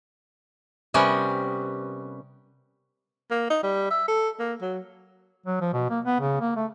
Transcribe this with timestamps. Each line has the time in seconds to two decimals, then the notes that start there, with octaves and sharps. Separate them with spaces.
0.94 C3 G3 B3 C#4 A#4
3.31 A#3
3.50 D#4
3.63 G3
3.91 E5
4.08 A4
4.40 A#3
4.62 F#3
5.46 F#3
5.61 F3
5.73 B2
5.90 A#3
6.05 B3
6.20 C#3
6.41 A#3
6.56 A3